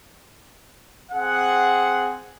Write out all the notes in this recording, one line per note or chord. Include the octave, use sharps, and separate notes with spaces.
C4 G#4 F#5